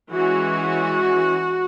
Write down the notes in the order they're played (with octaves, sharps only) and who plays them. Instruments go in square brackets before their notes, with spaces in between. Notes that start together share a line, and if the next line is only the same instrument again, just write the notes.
[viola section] E3 G#3 C#4 F#4